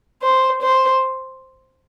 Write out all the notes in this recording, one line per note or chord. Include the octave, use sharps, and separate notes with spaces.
C5
C5